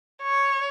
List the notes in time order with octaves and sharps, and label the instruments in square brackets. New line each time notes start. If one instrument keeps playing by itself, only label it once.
[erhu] C#5